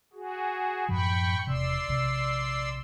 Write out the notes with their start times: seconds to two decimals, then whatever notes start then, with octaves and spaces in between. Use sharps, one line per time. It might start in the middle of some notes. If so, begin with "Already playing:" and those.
0.13 F#4 G#4
0.89 F#2 A2 F3 G5 B5 C#6
1.47 E1 C3 D5 C6 E6
1.88 A#1 C3